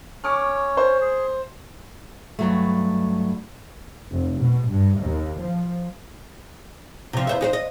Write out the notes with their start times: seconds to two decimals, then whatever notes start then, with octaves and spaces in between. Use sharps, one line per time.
0.24 C#4 C#5 C#6 D6 F6
0.77 C5
1.01 G#4
2.39 G2 F#3 A3
4.12 F1
4.41 B2
4.70 G2
5.03 D#2
5.42 F3
7.13 C3 F3
7.27 E2 C5 E5
7.41 D#4 G4 C5
7.53 D#5